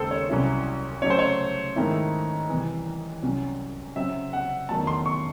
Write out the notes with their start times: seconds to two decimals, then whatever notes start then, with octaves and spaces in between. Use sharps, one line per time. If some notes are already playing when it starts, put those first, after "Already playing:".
Already playing: D#2 C#3 G#3 A4 C5
0.11 C#5
0.29 C2 C3 F#3 C#4 E4
1.02 C#3 F#3 A3 C#5
1.10 C5
1.19 C#5
1.76 G#2 D#3 A3 C4 E4
2.49 C2 C3 E3
3.22 C2 C3 F#3 C#4
3.96 C#3 F#3 C4 E5
4.33 F#5
4.69 E2 D#3 F#3 A3 A5
4.87 C6
5.06 C#6